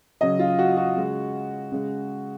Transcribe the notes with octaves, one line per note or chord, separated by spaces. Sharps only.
C#3 F#3 D#5
F4
F#4
F#4
C#3 G#3
C#3 G#3